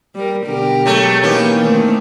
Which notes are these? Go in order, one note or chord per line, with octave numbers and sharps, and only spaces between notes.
G3 A#4
B2 D3 G4 A#4
F#3 G#3 A3
E3 A#3 C#4 D#4 G4
D#3 A3 C4